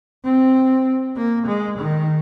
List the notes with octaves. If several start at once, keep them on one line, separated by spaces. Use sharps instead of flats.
C4
A#3
G#3
D#3